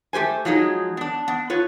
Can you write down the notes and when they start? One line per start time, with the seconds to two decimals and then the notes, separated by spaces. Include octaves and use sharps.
0.13 A3 G4 C5 G#5
0.45 F3 F#3 G#3 D#4
0.97 B3 D4
1.28 B3
1.50 F4 B4 C#5